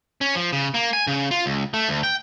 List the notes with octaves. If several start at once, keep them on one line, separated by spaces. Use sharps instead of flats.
C#4
F3
C#3
A#3
G#5
C#3
F4
C#2
A3
D2
G5